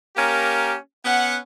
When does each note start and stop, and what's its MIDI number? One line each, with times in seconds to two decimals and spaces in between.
0.17 0.74 58
0.17 0.74 61
0.17 0.74 67
0.17 0.74 70
1.04 1.36 59
1.04 1.36 61
1.04 1.36 78